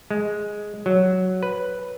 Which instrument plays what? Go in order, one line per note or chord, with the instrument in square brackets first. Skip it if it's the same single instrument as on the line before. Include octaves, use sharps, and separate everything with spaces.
[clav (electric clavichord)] G#3
F#3
B4